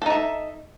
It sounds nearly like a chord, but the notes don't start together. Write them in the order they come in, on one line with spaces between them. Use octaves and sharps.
A4 D#4 E5